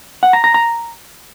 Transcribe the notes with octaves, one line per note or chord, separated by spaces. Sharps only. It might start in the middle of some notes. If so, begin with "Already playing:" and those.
F#5
A#5
A#5
A#5